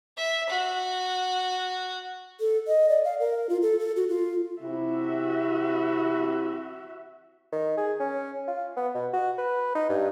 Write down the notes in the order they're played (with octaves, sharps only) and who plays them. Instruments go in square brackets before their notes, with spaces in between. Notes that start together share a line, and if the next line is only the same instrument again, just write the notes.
[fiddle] E5
F#4
[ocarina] A4
D#5
D5
F5
A#4
F4
A4
A4
F#4
F4
[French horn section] C3 E4 [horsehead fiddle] F#4 E5
[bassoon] D#3
G#4
C#4
F4
B3
B2
F#4
B4
D#4
G2